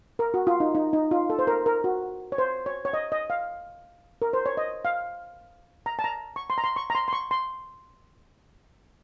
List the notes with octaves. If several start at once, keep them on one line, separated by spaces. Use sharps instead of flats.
A#4
F#4
F4
D#4
D#4
D#4
F4
A4
C5
A#4
A#4
F#4
C#5
C5
C#5
C#5
D#5
D#5
F5
A#4
C5
C#5
D#5
F5
A#5
A5
A#5
C#6
C6
A#5
C6
C#6
A#5
C6
C6
C#6
C6